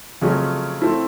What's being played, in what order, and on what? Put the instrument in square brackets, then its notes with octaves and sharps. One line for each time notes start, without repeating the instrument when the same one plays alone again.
[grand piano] F2 C#3 F#3 A3 C#4
A3 C4 E4 A4